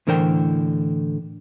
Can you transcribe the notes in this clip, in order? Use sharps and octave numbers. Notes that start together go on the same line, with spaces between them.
A2 D3 E3 A#4 C5 G5